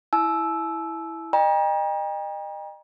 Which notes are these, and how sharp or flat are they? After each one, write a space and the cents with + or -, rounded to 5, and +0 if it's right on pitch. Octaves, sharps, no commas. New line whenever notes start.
E4 +0 A5 -45 E6 +0
D#5 -30 G5 +35 A#5 +30